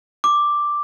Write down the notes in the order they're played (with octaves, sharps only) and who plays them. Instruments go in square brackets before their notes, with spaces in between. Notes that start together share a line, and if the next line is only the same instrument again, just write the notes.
[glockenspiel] D6